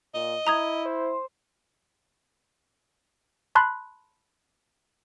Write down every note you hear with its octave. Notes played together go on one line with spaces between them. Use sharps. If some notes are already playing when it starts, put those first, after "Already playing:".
A#2 D#5
E4 A#5 D#6 G#6
C5
A5 B5 C6 F#6